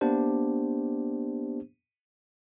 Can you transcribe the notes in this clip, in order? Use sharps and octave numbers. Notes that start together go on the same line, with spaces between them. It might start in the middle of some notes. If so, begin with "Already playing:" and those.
A#3 B3 D4 G4 C5